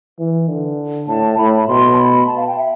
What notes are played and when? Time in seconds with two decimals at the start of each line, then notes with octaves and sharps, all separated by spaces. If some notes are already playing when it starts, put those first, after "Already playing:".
0.19 E3
0.48 D3
1.08 A2 A5
1.37 A2 B5
1.68 B2 C6
1.93 A5
1.98 B5
2.27 A5
2.37 F5
2.47 G5
2.57 E5